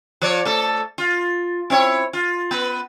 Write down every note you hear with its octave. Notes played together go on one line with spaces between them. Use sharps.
F3 C#5 D5
A3 A4
F4
C4 E4 C#5
F4
B3 B4